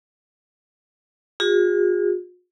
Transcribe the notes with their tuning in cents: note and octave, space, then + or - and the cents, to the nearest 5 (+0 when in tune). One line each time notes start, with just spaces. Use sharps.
F4 +45 G#4 -35